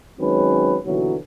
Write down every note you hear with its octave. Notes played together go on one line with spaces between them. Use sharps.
D#3 F#3 G#3 C4 C#4 B4
D#2 B2 D3 E3 F#3